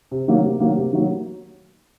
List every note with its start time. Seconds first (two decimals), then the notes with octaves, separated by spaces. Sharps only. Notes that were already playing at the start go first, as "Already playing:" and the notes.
0.11 C3
0.28 D#3 F#3 A#3
0.44 C3
0.60 D#3 F#3 A#3
0.77 C3
0.93 D#3 F#3 A#3